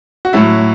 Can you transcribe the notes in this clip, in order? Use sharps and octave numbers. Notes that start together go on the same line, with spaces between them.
F#4
A2 F#3 E4